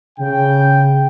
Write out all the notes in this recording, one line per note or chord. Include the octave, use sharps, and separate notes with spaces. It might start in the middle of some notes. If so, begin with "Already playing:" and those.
C#3 G5